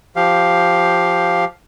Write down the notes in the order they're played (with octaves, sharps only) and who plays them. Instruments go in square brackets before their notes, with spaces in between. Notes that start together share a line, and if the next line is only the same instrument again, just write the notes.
[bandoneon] F3 G4 F5